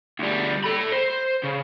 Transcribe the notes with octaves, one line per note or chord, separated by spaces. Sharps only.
D2 G3
A4 B5
C5
C#3